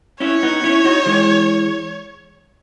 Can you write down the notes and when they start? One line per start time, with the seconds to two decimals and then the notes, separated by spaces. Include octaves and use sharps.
0.20 C#4 E4 C#5
0.43 B3 D#4
0.63 C#4 E4
0.85 D#4 F#4
1.06 E3 G#3